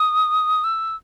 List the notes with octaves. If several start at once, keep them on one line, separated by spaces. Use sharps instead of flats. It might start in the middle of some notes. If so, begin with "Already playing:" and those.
Already playing: D#6
E6